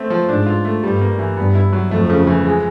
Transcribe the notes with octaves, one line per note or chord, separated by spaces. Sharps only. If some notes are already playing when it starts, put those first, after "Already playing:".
Already playing: A3 C4
F3
G#2 D4
F4
A3
G2 G3
A#3
E3
G2 B3
E4
F#3
F2 A3
C#3
E3
G#3